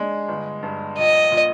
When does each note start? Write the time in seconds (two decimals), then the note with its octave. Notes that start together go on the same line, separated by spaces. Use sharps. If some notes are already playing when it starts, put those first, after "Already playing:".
Already playing: G#3 D4
0.28 G1
0.63 G2
0.98 A#1 D#5
1.32 A#2